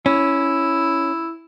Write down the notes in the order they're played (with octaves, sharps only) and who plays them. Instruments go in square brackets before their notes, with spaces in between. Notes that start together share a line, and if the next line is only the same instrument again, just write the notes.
[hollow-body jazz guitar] C#4 [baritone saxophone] E4